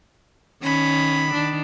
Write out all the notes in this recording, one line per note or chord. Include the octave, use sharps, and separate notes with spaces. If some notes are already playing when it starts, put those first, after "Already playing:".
D#3 C#4 B5
D#3 D4